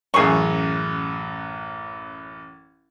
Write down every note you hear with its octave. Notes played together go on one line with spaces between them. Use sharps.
A1 F#2 G#4 C#6